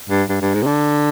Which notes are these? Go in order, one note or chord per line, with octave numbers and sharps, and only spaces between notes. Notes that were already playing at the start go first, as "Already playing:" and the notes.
G2
G2
G2
G#2
C3
D3